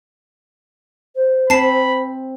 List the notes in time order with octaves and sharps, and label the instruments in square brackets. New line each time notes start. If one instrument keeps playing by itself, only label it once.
[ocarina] C5
[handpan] C4 [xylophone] A5 C7 [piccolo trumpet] B5